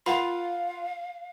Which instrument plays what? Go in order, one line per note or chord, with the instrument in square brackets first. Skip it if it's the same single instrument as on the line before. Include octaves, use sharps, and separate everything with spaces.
[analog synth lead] F4 [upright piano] A#4 F#5 F7 [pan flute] F5 [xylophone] B5 C6 C7